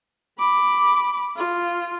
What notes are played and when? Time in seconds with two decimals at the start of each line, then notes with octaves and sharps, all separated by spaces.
0.39 B5 D6
1.36 F4